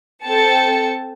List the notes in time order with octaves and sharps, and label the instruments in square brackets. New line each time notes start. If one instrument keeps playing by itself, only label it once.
[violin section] C4 A4 G5 A5 C#7